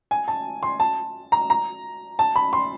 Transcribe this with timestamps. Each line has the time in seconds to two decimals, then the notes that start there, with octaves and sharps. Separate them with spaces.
0.11 G#5
0.28 A5
0.63 C6
0.80 A5
1.32 A#5
1.50 A#5
2.19 A5
2.36 B5
2.53 C6